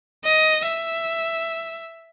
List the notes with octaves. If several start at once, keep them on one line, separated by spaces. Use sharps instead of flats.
D#5
E5